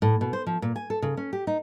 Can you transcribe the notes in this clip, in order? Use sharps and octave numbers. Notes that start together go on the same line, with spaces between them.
A2
B2
C5
F3
A#2
G#5
A4
C#3
C#4
G4
D#4